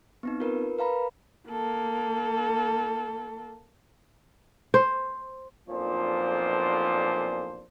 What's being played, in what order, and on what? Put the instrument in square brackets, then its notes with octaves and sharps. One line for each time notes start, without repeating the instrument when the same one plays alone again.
[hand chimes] B3 C4 D#4
F4 A#4 B4
A#4 B4 F5 A#5 B5
[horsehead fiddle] A#3 A4
[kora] C5
[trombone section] B1 F2 A#2 F3 D4 C5